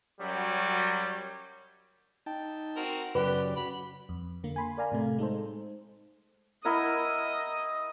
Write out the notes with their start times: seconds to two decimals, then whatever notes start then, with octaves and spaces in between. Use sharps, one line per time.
0.19 F#2 F#3 G3
2.26 D#4 G5 A5
2.76 C4 F#4 A#4
3.15 F#2 C#3 G4 B4 D5
3.56 F#4 B5
4.09 F2
4.44 D3 A#3
4.56 G#5 B5 C6
4.77 A#4 D5 F5 G#5 A#5
4.91 A2 C3 A3
5.18 G#3 D#4 A4 C5
6.65 E4 A#4 D#5 F#5